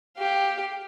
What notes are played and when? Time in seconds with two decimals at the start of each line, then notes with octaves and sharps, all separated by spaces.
0.17 G4 F5